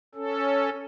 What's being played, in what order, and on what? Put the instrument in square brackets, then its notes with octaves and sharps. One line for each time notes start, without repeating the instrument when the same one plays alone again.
[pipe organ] C#4 A4